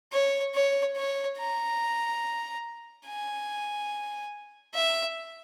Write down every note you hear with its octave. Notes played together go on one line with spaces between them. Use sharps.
C#5
C#5
C#5
A#5
G#5
E5